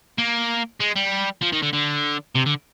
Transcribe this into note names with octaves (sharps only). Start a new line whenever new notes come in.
A#3
G#3
G3
F3
D#3
D3
D3
C3
D3